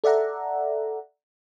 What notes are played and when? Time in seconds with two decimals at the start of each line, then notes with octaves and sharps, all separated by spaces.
0.04 A4 D5 E5 F#5 A#5